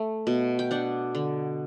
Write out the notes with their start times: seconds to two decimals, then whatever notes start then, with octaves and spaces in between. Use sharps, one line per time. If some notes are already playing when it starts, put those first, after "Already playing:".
Already playing: A3
0.27 B2
0.59 G5
0.71 D4 F#5
1.15 D3